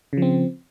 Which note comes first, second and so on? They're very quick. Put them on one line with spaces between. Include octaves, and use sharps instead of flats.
C#3 F3 C4